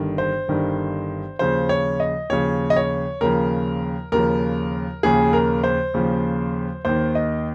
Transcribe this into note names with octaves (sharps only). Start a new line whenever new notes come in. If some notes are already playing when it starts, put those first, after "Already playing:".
Already playing: G1 G2 D#3
C5
G1 G2 D#3
D#2 C#3 F3 C5
C#5
D#5
D#2 C#3 F3 C#5
D#5
C#5
D#2 C#3 F3 A#4
D#2 C#3 F3 A#4
D#2 C#3 F3 G#4
A#4
C5
D#2 C#3 F3
D#2 D#3 C5
D#5